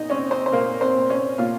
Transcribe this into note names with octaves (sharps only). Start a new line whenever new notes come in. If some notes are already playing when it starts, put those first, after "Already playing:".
Already playing: A#2 D#4 D#5
C4 C#4 C#5
C4 C5
C5
A#2 A#3 A#4
C4 C5
A#2
C#4 C#5
A#2 F4 F5